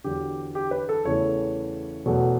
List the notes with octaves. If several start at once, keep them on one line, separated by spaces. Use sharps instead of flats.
E2 D3 F#3 G4
G4
B4
A4
E2 C#3 E3 A3 C#5
E2 B2 F#3 A3